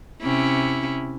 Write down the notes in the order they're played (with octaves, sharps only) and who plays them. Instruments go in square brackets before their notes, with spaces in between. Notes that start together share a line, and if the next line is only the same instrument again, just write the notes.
[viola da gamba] C3 C#4 E4